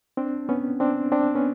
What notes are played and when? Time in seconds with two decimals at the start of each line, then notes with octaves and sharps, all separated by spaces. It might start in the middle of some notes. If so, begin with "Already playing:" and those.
0.17 C4 D4
0.49 B3 C#4
0.80 C4 D4
1.12 C4 D4
1.35 B3 C#4